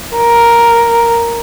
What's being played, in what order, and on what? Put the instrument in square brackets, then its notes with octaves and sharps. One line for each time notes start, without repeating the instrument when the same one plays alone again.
[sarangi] A#4